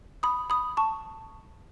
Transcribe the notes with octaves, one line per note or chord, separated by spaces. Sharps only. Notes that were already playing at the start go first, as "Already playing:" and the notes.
B5 D#6
B5 D#6
A5 C#6